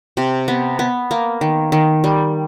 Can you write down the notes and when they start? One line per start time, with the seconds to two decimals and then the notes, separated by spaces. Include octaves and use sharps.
0.17 C3
0.48 B3
0.79 B3
1.11 A#3
1.41 D#3
1.72 D#3
2.04 G3